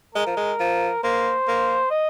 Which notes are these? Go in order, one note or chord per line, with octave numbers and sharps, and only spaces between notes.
G#3 A#4
F3
G#3
F3
A#3 C5
A#3
D#5